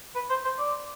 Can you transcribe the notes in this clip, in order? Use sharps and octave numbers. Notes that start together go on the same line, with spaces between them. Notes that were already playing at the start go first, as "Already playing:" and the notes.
B4
C5
C5
D5